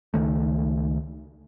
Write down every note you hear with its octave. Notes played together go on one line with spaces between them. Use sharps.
C#2 D#3 A3